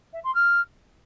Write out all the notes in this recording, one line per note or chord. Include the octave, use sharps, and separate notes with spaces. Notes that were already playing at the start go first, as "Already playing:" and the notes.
E5
C6
F6